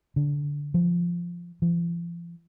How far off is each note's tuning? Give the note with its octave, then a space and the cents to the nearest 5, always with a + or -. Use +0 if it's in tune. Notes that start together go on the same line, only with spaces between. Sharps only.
D3 -15
F3 -10
F3 -40